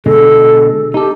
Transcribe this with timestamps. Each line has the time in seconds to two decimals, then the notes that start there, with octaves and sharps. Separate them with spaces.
0.06 B2 D3 G#3 A4
0.94 D#4 G4 A4